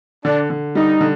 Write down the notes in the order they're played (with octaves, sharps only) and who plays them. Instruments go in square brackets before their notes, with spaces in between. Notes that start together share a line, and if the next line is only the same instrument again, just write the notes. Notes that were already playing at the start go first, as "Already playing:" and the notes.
[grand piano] D3 [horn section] D4
[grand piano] D3
[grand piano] G3 [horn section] D#4
[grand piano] D3